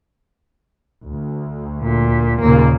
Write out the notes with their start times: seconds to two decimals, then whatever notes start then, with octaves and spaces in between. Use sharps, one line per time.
1.07 D2
1.83 A#2
2.42 D#2 A#2 C#3 A#3